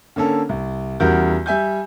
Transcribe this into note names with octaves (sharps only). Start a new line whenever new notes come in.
D3 A#3 C#4 A4
C2
E2 C#3 G3 F#4 A#4 G6
G3 E5 G#5 G6